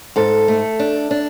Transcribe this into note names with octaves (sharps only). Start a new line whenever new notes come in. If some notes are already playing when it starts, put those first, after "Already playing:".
G#2 A4
A3
D4
D4